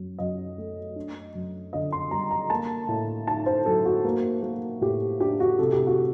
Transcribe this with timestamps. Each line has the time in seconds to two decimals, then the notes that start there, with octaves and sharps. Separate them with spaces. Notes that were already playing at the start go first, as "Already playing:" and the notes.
Already playing: F#2
0.19 F#2 D#5
0.58 A3
0.96 D4
1.35 F#2
1.73 D3 D#5
1.92 C6
2.11 G3 A#5
2.31 A#5
2.50 A#3 A5
2.88 A2
3.27 D#4 A5
3.46 C5
3.66 F#3 A4
3.85 F#4
4.04 A#3
4.43 A#3
4.81 A2 G4
5.20 D4 G4
5.40 F#4
5.59 C3 A4
5.72 G4
5.87 F#4